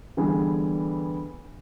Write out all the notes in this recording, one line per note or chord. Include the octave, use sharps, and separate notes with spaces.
D3 E3 G3 B3 G#4